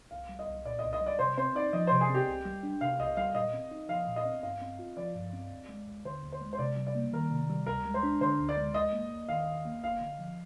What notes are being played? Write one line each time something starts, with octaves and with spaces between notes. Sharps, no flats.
C2 F5
G3
D#5
C2
A#2 D5
C2 D#5
D#5
G3
D5
C3 C5
C4 C5
D#4 D5
F3 D#5
C3 C5
G#4
C4
G4
C2
G3
D4
C3 F5
C2 D#5
G3 F5
A#2 D#5
C4
D#4
F3 F5
A#2
D#5
C4
G2 F5
C4
F4
F3 D5
G2
C4
D#2
G#3
D#2
D3 C5
D#2
C5
G#3
C5
C3 D5
G3
D5
A#3
D#3 A#4
C3
G3
D2 A#4
G#3
C5
D4
D3 C5
D2
D5
G#3
D#2 D#5
A#3
D#2
D#3 F5
D#2
A#3
G1 F5
D3
F3